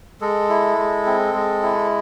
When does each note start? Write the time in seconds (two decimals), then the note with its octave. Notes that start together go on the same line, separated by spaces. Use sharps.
0.21 G#3 A4
0.49 E4
0.78 G#3
1.06 C4
1.34 G#3
1.63 E4